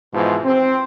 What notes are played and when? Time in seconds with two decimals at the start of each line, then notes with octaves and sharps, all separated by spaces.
0.13 G#2 B2 E3 F3
0.44 C4